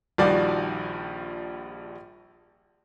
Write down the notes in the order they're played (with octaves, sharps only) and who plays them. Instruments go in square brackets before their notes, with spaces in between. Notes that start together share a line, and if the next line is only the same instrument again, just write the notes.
[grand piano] A#1 D#3 F3 G3 F#4 D5